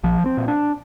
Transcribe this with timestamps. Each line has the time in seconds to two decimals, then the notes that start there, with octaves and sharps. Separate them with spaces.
0.04 A#1 F3
0.26 C4
0.37 A#2
0.48 D4